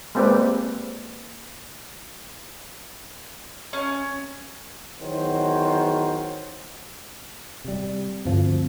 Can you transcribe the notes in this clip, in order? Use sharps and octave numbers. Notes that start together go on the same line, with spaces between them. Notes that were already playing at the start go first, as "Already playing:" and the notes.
G#3 A#3 C4 G4 B4 D5
C#4
E2 D#3 F#3 C5
C3 G3
D2 G2 D3 F3 C4